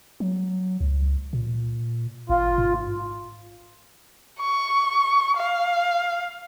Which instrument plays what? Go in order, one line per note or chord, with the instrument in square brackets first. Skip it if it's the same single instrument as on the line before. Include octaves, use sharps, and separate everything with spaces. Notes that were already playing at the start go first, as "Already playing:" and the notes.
[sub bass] F#3
C#2
A#2
[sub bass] G#1 [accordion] F4
[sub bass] G#2
[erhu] C#6
F5